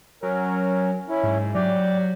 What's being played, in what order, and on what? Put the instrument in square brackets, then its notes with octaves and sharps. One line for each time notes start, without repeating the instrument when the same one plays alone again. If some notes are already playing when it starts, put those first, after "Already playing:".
[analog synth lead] F#3 [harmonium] C#4 A#4
[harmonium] C#4 E4
[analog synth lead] G#2
[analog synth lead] F#3 [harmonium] G4 D5